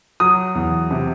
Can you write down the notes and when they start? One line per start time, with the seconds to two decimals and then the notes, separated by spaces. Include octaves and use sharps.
0.20 F#3 D#6
0.55 E2
0.91 C3